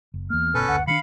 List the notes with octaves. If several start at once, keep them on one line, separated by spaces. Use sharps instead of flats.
F#1
E2 A#3 F6
G1 B2 C#4 A4 B4
F#1 D2 F#5
D#3 E3 D4 F5 B5 C#7